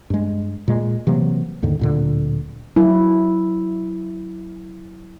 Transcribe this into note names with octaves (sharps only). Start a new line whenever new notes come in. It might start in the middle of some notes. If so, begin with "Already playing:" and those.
G2 G#3
A#2 G#3
C3 E3 F#3 A#3
D#2 G#2 D3 D#3
D1 A#2 D3
F#3 E4